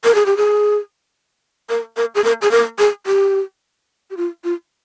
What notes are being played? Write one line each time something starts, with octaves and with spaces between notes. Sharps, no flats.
A#4
G#4
G4
G#4
A#4
A#4
G#4
A#4
G#4
A#4
G#4
G4
G4
F4
F4